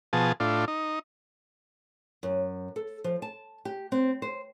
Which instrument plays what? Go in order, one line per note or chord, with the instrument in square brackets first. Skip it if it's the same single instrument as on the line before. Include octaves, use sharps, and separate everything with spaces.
[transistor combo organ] B2 F3 G#4 A5
A2 D4 F4
D#4
[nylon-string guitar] F#2
A4
F3
A5
G4
C4
C5